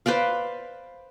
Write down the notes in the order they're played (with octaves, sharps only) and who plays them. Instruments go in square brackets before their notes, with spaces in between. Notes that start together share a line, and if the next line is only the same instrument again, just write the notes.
[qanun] B4 C5 D5 F5